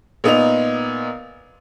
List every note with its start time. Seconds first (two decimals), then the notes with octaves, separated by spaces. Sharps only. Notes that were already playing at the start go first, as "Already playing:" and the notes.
0.24 A#2 B3 D#4 F7